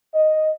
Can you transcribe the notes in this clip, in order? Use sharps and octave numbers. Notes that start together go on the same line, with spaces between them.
D#5